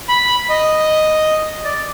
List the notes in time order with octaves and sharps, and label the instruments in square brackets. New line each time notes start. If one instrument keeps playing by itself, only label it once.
[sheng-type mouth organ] B5
D#5
D5